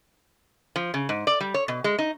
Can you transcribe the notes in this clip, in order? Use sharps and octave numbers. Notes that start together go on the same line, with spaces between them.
F3
C#3
G#2
D5
G3
C#5
B2
G#3
D#4